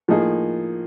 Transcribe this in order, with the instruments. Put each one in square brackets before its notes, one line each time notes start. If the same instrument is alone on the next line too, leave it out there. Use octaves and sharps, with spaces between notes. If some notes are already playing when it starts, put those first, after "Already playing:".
[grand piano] A2 F3 A#3 D#4 G#4